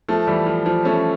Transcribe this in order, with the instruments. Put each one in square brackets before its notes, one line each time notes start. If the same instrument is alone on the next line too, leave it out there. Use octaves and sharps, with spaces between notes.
[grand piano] F3 A3
E3 G3
F3
F3
A3 C#4